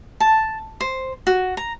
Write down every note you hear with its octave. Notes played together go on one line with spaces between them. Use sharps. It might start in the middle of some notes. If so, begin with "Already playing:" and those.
A5
C5
F#4
A#5